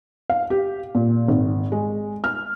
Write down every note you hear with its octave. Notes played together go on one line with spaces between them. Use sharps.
F5
G4
A#2
G#1
G#3
F6